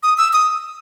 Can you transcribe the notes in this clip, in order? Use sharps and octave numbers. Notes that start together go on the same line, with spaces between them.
D#6
E6
D#6